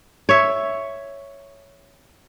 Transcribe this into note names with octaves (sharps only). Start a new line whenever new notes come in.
C#5 E5